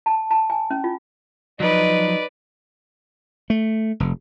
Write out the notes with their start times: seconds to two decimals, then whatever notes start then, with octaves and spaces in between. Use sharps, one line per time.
0.06 A5
0.31 A5
0.50 G#5
0.70 C#4
0.84 F4
1.60 F3 F#3 D#4 B4 D5
3.50 A3
4.00 F1